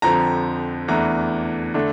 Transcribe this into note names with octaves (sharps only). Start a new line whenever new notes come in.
F2 D3 F3 C4 A#5
E2 E3 A3 D4 A#5
D3 A3 D4